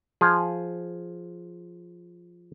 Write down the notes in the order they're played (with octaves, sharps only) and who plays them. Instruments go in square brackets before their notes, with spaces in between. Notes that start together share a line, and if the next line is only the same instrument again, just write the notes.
[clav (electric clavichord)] F3 G#4